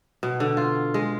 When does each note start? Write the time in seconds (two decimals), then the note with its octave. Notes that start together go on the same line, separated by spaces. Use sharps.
0.23 B2
0.40 D3
0.57 F4
0.94 G#3